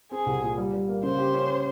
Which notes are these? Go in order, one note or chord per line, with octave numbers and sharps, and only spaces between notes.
C4 G#4
C2
A#2
G3
G3
A#3
C#3 C5
G4
C#4